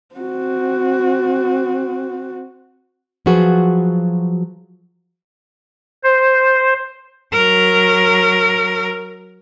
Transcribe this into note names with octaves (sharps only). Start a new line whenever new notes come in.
C4 F#4
F3 F#3 F4 F#4 G#4 B4
C5
F#3 A#4